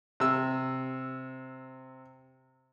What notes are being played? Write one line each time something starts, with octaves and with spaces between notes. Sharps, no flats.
C3 E6